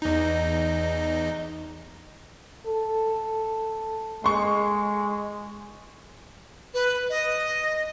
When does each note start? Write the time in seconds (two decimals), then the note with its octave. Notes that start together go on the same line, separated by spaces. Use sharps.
0.02 E2 D#4
2.67 A4
4.24 G#3 C6 C#6
6.73 B4
7.09 D#5